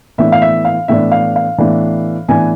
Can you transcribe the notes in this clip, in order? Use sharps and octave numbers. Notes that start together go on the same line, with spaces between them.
A2 E3 B3 D4 E5
F5
E5
F5
A2 E3 B3 D4 E5
F5
F5
A2 E3 B3 D4
A2 E3 B3 D4 G#5